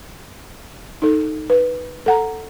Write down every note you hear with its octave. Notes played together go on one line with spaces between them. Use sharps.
D#4 A4
B4
A4 F#5 A#5